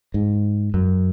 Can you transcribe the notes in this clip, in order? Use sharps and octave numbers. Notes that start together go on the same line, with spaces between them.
G#2
F#2